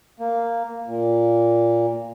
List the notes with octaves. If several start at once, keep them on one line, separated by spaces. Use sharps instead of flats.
A#3
A#2